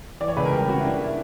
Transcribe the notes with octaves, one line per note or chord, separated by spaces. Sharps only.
E3 D5
C#5
C#2 B4
A#4
G3 G4
C#3 F#4
E4
A#3 D4
E4